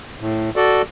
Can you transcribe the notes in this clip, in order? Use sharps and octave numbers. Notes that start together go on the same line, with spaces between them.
A2
F#4 A4 D5